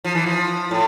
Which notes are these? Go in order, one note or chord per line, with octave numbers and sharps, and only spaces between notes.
F3
E3
F3
A2